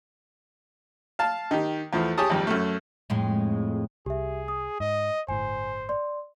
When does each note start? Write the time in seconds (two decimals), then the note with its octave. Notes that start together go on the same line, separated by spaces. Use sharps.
1.19 F5 A5
1.51 D#3 G4
1.93 E2 F3 A3
2.18 G4 G#4 C#5 A5 D#6
2.30 G#1 F2 G3
2.47 F#2 A3
3.10 F2 A2 G#3
4.06 C2 G4 G#4 E5
4.48 D#6
4.80 G#2 D#5
5.28 G1 A2 C5 G#5
5.89 D5 C6